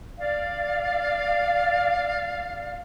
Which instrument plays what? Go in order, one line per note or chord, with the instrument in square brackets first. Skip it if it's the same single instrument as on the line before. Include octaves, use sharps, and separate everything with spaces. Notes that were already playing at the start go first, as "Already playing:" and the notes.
[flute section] D5 F5